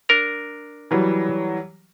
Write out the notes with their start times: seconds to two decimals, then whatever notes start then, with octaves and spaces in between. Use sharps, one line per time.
0.09 D4 A#4 A#5
0.91 E3 F#3 G3